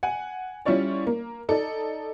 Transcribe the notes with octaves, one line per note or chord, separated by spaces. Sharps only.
F#5 G#5
G3 C#4 E4 F4 C#5 D5
A#3
D#4 A4 D5